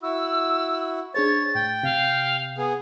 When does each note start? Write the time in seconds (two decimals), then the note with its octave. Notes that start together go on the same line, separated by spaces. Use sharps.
0.03 E4 F#4 E6
1.14 D4 G#4 C5 C#5 A6
1.55 A2 G5
1.83 C3 F5
2.58 B3 G#4